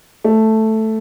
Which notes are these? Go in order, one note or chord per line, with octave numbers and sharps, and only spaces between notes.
A3